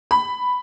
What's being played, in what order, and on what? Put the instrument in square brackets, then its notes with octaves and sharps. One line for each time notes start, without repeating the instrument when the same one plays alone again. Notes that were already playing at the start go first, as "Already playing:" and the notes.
[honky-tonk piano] B5